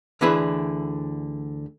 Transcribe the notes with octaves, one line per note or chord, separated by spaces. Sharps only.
D2 D3 E3 E4 G#4 B4